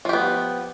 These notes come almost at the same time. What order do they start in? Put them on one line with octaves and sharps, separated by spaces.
F3 G4 B3